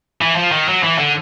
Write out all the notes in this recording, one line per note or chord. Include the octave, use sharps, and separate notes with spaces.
E3
F3
D#3
F#3
E3
D3